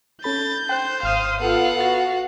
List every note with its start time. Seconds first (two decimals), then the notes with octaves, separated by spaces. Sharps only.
0.24 C#4 A4 B5 G6 A6
0.69 C5 G5 F#6
1.03 G#1 F5 D#6 F6 G6
1.41 B3 F4 A4 F5 F#5
1.80 F#4 A6